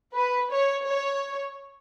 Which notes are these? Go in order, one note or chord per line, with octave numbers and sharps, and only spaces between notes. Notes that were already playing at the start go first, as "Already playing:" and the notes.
B4
C#5
C#5